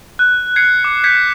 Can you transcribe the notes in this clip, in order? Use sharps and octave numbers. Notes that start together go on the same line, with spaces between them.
F#6
G#6 C7 C#7
D6
G6 G#6 B6 C#7